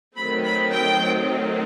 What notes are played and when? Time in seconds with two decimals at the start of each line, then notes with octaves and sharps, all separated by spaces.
0.17 D#3 F#3 A3 C4 B5
0.44 B5
0.73 G5